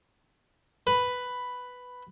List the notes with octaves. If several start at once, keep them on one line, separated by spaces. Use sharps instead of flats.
B4